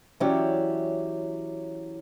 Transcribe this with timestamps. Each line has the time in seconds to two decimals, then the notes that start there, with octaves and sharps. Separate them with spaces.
0.20 E3 F#3 C#4 E4 G4 D5